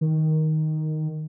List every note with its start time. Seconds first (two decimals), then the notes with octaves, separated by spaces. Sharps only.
0.01 D#3